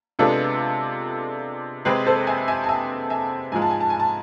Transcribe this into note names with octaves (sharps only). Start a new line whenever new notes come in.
C3 G#3 B3 D4 F4 A4
C3 G#3 C4 G#4 B4
A4 C5
E5 G#5
E5 G#5
A5
E5 G#5
E5 G#5
G#2 F3 G#3 G#5
A5
G#5
A5
G#5
A5